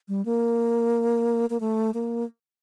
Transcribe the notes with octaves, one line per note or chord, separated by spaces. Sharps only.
G3
A#3
A#3
A3
A#3